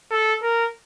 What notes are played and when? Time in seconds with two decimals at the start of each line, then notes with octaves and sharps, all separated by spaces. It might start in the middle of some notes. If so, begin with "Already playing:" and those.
0.11 A4
0.43 A#4